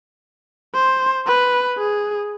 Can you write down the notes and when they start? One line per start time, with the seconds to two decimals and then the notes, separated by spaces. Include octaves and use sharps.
0.74 C5
1.27 B4
1.78 G#4